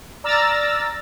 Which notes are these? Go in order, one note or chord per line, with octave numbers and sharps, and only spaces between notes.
D5 A#5 E6 F6 A6 A#6